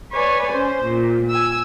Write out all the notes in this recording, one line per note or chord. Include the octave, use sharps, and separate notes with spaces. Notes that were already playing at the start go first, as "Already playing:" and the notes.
B4 C#5 D5 G#5
C#4 C5
A#2
G#5 E6